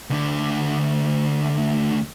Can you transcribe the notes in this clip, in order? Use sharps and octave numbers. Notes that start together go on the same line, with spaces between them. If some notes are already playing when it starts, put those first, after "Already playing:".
D2 D3